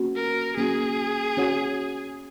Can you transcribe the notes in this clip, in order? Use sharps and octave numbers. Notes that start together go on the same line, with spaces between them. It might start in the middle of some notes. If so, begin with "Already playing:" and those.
Already playing: A#3 C#4 F#4
A#4
A#3 C#4 F#4 G#4
C#4 F#4 C#5 F#5